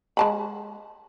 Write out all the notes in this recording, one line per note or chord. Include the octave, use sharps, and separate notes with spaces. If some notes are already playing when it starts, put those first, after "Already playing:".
G#3 A5 B5